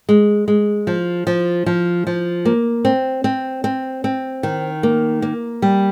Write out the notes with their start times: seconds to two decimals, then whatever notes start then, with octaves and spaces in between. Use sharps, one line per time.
0.09 G#3
0.48 G#3
0.87 F3
1.27 F3
1.66 F3
2.07 F3
2.45 A#3
2.85 C4
3.24 C4
3.64 C4
4.04 C4
4.43 D#3
4.83 A#3
5.22 A#3
5.62 G3